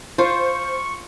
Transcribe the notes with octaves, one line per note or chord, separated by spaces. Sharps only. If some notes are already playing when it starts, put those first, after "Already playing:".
F4 C5 C#6